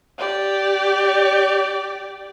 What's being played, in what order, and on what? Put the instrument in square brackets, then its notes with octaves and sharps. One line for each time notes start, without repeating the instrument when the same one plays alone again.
[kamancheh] G4 D5